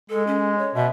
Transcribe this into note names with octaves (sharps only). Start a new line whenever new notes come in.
G#3 A4
C#4
C#5
B2 E5